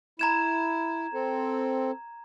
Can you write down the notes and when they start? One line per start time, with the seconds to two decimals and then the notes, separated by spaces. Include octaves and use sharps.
0.19 E4 A#5 G#6 E7
1.13 C4 A4